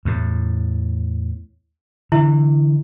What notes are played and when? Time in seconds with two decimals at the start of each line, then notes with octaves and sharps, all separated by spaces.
0.05 E2 A2
2.12 D3 E3 E4